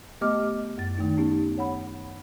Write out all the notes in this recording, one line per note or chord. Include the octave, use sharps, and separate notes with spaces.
A3 B3 G4 D#5 D6 F6
F#2 A6
D#3 A3 D#4
B3 C#4 D#4 G4
C#5 F#5 B5